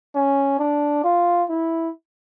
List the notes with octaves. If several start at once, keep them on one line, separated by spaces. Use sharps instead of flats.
C#4
D4
F4
E4